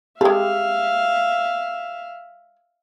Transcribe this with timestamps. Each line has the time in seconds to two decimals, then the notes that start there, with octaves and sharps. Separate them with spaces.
0.21 G#3 G4 A4 E5 F5